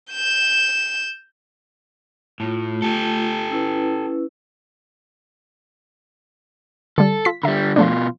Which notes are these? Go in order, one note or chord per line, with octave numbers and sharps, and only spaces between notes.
G6 E7
A2 A3 F4
G4 A4
C#4 E4 B4
D3 G3 A4
F4 B6
D3 G3 A#4 E5
B2 F3 A3 D4 F4